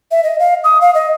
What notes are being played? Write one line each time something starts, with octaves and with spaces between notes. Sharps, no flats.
E5
D#5
F5
D#6
F5
D#5